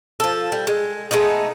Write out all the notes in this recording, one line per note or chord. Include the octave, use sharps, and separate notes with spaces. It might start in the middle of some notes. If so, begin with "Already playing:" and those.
F3 A4
G3
G#3
G#3 A3 B3 D#4